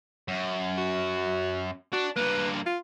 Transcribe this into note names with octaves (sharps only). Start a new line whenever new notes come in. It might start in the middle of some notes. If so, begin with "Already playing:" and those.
F#2
F#4
D4 F#4
G2 A#3 B4
F4